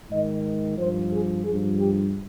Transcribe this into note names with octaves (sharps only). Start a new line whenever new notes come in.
G#2 D#3 D#5
G2 F3 C5
G#4
G2 F3 G#4
G4